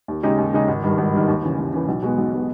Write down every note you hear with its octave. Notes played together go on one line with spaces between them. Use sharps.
D#2
C#3 G#3 D#4 G4
D#2
C#3 G#3 D#4 G4
G#1
G2 D#3
G#1
G2 D#3
D#2
C#3 E3
D#2
C#3 E3
B1
B2 G#3 B3
B1
B2 G#3 B3